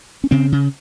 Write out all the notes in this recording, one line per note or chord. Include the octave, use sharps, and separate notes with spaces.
C#4
C#3 C4
C#3